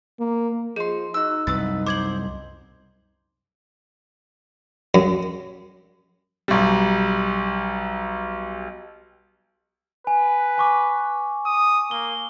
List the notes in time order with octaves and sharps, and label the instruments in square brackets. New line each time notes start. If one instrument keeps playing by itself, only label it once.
[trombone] A#3
[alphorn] F3 [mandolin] D#4 C6 [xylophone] G#4
[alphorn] D#4 [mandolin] F#4 E6
[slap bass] C2 F#2 [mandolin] B4 [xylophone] E6 A6
[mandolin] C5 [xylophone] D6 G#6 F#7
[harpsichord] F#2
[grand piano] B1 G3
[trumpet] B4 [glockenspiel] G#5
[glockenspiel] G#5 C#6 D6
[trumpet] D#6
[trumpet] A#3 [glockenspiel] G7